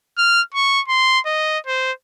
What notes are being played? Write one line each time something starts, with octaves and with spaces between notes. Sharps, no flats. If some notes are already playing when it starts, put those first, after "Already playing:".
F6
C#6
C6
D#5
C5